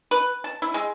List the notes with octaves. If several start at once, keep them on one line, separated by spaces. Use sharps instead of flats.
B4
A5
E4
G#3